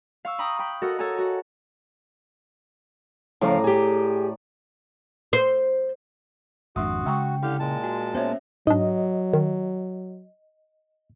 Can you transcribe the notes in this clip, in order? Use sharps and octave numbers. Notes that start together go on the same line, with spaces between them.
F5 C#6 E6
G5 A#5 B5 D#6
G5 B5
F#4 A4 A#4 D#5
A4 C#5 D#5 G#5 A#5
F#4
A2 C#3 F3 D5 F5 A#5
G4 G#4
C5
G#1 F2 G#3 D4 F#4 E5 C6 D#6
C#3 G#3 G5 A#5 C#6
D3 E4 G4 F5
A#2 G#3 A5
F#4 G#5 A#5
A#3 B3 C#4 C5 C#5 E5
G#2 F#3 D4 D#5
D#3